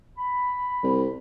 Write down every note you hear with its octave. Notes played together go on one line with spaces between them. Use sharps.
B5
C2